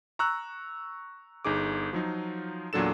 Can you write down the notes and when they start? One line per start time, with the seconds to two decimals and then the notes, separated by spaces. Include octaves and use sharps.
0.19 A#5 C#6 E6 F#6
1.45 G1 D#4 G#4 D6
1.93 F3 F#3 D#4 F4
2.73 E2 A#2 F#3 D4 A4 E7